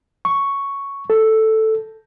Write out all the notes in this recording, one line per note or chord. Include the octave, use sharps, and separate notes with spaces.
C#6
A4